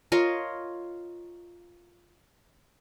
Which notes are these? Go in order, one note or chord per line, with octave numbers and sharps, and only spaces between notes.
F4 A#4 C#5 D#5